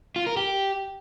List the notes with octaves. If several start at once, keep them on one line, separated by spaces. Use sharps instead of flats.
F4
A#4
G4